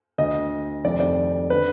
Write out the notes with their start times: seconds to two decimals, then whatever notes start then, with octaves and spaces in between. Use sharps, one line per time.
0.18 D2 D3 D#5
0.85 F1 F2 D#3 D5
1.00 D5
1.50 D3 B4